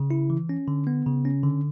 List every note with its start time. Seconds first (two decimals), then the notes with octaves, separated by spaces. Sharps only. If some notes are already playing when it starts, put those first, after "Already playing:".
Already playing: C#3
0.11 E4
0.30 E3
0.49 C#4
0.68 D3
0.87 B3
1.07 C#3
1.25 C#4
1.44 D3